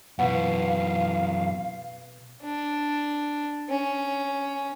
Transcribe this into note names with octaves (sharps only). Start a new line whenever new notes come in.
F#2 B2 E3 F5 F#5
D4
C#4